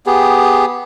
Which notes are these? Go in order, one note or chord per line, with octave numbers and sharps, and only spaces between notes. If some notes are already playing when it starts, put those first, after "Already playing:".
B3 G4 G#4